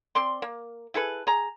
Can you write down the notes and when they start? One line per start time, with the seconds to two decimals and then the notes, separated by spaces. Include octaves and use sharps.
0.15 C4 D5 C6
0.42 A#3
0.94 E4 G#4 A4 B4
1.27 G#4 A#5